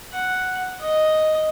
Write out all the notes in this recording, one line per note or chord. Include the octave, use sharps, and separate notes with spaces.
F#5
D#5